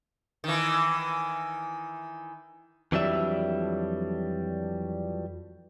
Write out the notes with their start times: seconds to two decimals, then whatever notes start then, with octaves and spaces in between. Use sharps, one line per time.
0.44 D#3 E3
2.92 F2 E3 F#3 G3 D4 E5